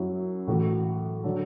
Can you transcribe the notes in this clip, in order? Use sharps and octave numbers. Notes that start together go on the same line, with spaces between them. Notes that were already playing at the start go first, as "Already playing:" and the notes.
Already playing: F#2 F#3 E4
A2 E3 F#4
D3 F#3 A4